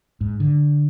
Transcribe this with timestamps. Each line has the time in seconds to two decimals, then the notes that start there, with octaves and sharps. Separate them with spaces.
0.21 G#2
0.40 D3